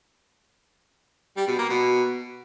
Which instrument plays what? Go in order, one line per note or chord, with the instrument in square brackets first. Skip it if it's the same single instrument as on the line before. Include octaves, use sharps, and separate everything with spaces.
[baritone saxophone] G3
B2
A#3
B2